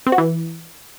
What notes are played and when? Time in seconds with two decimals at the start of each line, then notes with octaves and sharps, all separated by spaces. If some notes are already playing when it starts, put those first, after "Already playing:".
0.07 C4
0.12 F#4
0.18 E3